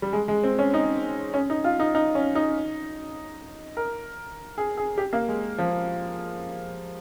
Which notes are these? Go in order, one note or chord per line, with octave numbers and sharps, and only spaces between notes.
G3
G#3
G#3
C4
C#4
D#4
C#4
D#4
F4
D#4
D#4
C#4
D#4
A#4
G#4
G#4
G4
A#3
G#3
F3